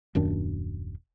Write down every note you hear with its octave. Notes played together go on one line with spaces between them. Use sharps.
D#1 F#2 D#3 D4